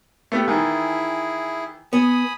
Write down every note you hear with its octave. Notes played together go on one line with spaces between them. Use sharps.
A3 B3 G4
D#3 E3 E4 G#4
B3 G#5 B5 D#6